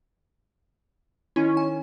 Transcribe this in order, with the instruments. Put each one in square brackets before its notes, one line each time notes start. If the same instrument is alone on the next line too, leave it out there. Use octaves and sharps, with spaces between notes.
[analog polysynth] D#3 C#4 [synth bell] E4
[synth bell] G#5